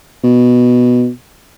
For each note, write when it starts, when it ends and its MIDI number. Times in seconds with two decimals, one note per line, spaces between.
0.24 1.09 47